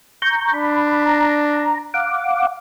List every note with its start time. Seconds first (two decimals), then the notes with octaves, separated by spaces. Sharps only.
0.22 A#5 C#6 G6
0.54 D4 B5
1.06 A#5
1.94 F5 F#5 D6